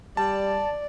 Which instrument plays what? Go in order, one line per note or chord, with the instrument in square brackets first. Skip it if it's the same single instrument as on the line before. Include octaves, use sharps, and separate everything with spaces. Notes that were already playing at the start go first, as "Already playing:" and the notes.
[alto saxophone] G3 [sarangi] D5 [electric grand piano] A5